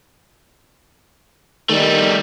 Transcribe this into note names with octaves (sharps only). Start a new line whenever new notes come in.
D#3 G3 A3